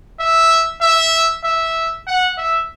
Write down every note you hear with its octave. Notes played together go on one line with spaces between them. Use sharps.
E5
E5
E5
F#5
E5